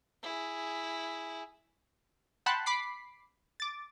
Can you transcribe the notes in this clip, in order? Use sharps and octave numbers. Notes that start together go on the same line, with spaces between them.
E4 G#4
F#5 G5 A5 B5 C6 F#6
B5 D6 B6 C7
D6 A6